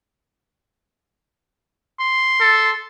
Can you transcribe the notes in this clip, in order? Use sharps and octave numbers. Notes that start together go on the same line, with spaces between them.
C6
A4